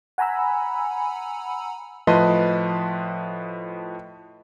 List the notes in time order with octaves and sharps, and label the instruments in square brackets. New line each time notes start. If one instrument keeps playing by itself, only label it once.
[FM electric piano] F#5 G#5 A#5 B5 E6
[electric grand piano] A2 F3 B4 D#5 A5 C6